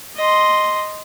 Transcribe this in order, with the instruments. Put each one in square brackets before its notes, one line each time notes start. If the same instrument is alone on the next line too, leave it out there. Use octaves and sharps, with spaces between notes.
[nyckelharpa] D#5 C6